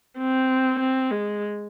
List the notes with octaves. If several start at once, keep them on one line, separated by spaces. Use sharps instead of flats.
C4
C4
G#3